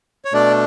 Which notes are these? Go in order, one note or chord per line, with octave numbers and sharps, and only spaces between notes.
C#5
B2 A3 D4 D5